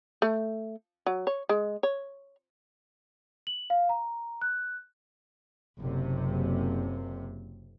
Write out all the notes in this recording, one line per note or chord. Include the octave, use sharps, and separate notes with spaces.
A3
F#3
C#5
G#3
C#5
F#7
F5
A#5
F#6
F#1 C3